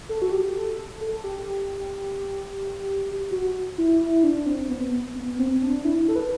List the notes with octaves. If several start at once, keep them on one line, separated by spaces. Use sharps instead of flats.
A4
F#4
G4
A4
A4
G4
F#4
E4
E4
D4
C4
B3
B3
C4
D4
E4
A4
B4